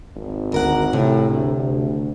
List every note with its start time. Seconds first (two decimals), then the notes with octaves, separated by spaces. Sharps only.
0.15 G#1
0.52 D2 A#4 F#5
0.93 A2 C3
1.31 D2
1.60 D2